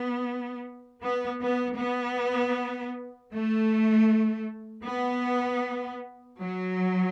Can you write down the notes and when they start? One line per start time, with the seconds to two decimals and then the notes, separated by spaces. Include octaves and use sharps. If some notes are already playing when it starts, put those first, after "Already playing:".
Already playing: B3
1.01 B3
1.40 B3
1.78 B3
3.32 A3
4.85 B3
6.39 F#3